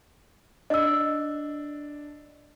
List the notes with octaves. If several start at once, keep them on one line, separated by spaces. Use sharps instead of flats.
D4 D#5 E6